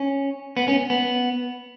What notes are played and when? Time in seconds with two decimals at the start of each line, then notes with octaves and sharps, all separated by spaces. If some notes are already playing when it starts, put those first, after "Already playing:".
Already playing: C#4
0.57 B3
0.68 C#4
0.90 B3